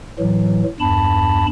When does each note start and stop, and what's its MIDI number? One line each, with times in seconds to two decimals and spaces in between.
0.19 0.63 45
0.19 0.63 52
0.19 0.63 54
0.80 1.47 40
0.80 1.47 43
0.80 1.47 81
0.80 1.47 83